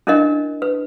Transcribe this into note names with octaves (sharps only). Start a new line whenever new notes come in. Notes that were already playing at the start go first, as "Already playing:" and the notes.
C#4 D4 E4 A#4 D#5
B4